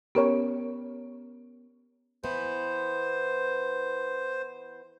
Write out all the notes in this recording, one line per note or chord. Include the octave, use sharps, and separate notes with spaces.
B3 C#4 G4 A#4 C#5
E3 B3 C5